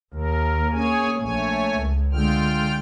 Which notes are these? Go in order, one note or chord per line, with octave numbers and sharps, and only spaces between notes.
D#2 A#4
A#3 C#4 G#4 C#5 G#5
A#1 A3 C#5 G#5
C#2
D3 G#3 F4 G5 F6